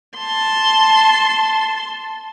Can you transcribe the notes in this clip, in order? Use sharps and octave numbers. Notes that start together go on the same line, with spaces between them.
A5 C6